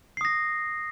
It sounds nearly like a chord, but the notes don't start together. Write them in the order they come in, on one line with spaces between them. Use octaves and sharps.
C7 D#6 A#6